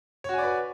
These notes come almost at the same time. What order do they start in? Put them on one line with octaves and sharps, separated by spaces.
C#5 F#4 G#5 D5 B4